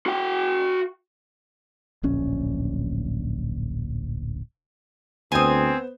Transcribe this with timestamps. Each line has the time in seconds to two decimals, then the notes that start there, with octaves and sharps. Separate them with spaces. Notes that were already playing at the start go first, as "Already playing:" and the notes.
0.06 F#4 G5
2.03 D1 A#1 C#4
5.32 D2 B3 C4 C5 G#5 D#6